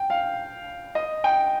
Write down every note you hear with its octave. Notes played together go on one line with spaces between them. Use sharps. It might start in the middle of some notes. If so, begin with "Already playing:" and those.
Already playing: G5
F5
D#5
G5